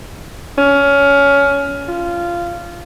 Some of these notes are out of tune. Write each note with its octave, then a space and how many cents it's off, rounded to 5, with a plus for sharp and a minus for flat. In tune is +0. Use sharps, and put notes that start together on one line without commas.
C#4 +20
F4 -15